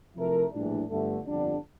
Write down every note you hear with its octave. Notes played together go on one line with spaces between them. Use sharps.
C3 F3 A3 E4 A#4
A#1 A2 E3 G3 D4
G1 G2 D3 A3
G1 F2 D3 G3 D4